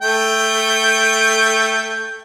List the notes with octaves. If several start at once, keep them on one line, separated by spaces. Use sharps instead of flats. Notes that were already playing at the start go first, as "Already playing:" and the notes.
A3 G5